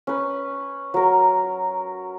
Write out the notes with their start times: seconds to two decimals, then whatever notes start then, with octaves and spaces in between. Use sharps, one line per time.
0.07 C#4 B4
0.94 F#3 A#4